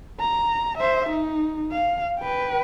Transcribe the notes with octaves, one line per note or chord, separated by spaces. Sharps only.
A#5
C5 E5
D#4
F5
B4 G5